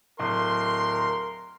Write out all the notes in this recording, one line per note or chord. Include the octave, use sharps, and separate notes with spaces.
D1 A#4 C6